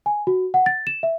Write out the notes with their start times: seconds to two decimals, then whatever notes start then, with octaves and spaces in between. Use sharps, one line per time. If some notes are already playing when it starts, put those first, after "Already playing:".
0.06 G#5
0.27 F#4
0.54 F#5
0.66 A6
0.87 E7
1.03 E5